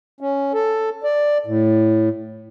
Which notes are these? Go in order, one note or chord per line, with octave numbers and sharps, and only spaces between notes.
C#4
A4
D5
A2